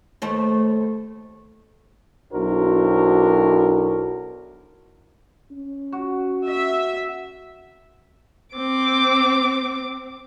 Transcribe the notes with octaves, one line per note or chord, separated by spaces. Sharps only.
D#2 A3 C5
B1 D4 E4 F#4 A#4 C5
C#4
F#4
E5
C4 D6